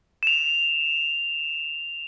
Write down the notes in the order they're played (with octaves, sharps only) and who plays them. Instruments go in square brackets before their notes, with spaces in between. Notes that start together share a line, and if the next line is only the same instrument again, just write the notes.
[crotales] E7 F7